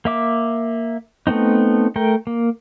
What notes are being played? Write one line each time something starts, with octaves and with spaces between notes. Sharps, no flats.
A#3 E5 D6
A3 B3 C4 D#4
A3 A#4 G5
A#3